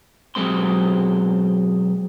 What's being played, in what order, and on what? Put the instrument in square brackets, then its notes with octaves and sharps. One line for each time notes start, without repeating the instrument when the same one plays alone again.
[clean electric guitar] B1 F#3 G#3 C4 C6